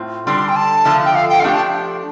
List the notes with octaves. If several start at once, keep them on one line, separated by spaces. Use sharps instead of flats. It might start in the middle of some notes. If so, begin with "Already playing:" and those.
Already playing: A2 C4 F4
D3 G3 D4 G4 C6
G5
A5
D3 F3 A3 F4
G5
F5
G5
F5
F3 A3 D4 G4 G5
A5